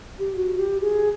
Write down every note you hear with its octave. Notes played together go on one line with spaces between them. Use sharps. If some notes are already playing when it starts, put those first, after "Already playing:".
G4
F#4
G4
G#4